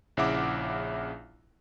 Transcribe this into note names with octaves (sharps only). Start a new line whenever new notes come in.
A#1 C#3 E4 E5 F#5 D6